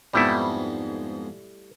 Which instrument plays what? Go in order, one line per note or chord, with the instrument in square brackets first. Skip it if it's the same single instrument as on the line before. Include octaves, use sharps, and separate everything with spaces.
[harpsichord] F2 G#2 B3 [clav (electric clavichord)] G3 A3 E4